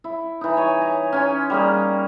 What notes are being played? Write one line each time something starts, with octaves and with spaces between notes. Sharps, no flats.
E4
E3 D#4
C#5 G#5
A#5
C#4 G#5 C6
G3 A#3 G#4